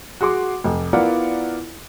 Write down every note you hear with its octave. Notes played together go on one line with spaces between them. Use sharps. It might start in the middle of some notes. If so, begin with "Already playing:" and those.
F#4 G#4 C6 D6
F1
B3 E4 F4 A#4 D5 F#5